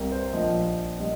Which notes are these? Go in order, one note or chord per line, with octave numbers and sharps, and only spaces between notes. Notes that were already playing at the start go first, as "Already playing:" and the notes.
Already playing: C2 C3 G3 A#4
C5
A#1 A#2 F3 D#5
A#2 G3 D#5